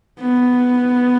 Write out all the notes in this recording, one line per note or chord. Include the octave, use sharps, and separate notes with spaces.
B3